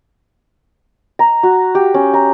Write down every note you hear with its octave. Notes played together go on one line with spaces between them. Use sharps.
A#5
F#4
G4
C#4
A#5